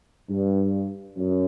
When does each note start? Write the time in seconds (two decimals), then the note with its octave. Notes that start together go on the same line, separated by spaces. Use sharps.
0.30 G2
1.17 F#2